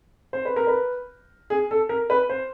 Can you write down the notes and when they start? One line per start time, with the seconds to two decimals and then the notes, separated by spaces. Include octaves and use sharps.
0.33 C5
0.45 B4
0.56 A#4
0.67 B4
1.50 G#4
1.71 A4
1.89 A#4
2.10 B4
2.29 C5